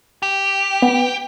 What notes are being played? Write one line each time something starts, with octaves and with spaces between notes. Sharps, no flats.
G4
B3